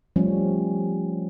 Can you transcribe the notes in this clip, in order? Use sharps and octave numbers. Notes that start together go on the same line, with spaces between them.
F3 G3 A3 C#4